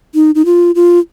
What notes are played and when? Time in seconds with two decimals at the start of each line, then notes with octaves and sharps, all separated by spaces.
0.15 D#4
0.35 D#4
0.45 F4
0.75 F4